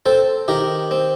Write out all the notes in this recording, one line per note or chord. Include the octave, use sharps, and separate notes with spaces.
C4 A4 C5
D#3 G4 A#4
C4